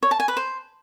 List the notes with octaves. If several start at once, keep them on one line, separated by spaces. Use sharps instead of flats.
C#5
A5
G#5
B4
C5